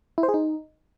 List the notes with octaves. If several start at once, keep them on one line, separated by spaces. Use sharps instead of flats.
E4
C5
G#4
D#4